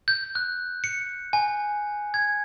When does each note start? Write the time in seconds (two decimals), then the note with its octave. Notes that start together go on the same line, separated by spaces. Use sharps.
0.08 G6
0.35 F#6
0.84 C#7
1.33 G#5
2.14 G#6